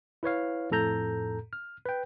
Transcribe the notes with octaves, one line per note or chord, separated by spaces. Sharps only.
E4 B4 C#5 F5
F2 A2 A4 A#5 G6
F6
B4 G5